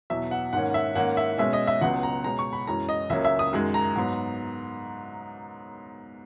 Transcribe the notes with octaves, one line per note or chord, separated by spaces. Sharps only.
E2 B2 F#3 E5
F#5
G#2 D#3 A#3 C#4 F#5
E5
G#2 D#3 A#3 C#4 F#5
E5
B2 G#3 C#4 E5
D#5
E5
C#2 C#3 F#3 B3 F#5
A#5
B2 G#3 C#4 A#5
C#6
B5
F#2 E3 G#3 C#4 A#5
D#5
C#2 C#3 F#3 A#3 C#4 E5
E5
D#6
F#2 D#3 G#3
A#5
G#2 F#3 B3